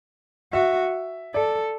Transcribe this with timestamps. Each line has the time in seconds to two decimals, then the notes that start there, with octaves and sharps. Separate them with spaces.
0.53 F#4 E5
1.34 A4 D5